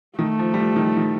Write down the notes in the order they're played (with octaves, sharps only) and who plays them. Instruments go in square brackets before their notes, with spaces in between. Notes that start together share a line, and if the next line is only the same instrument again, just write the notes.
[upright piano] D#3 [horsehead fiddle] A3
[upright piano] F3
G3
F3
D#3
F3
D#3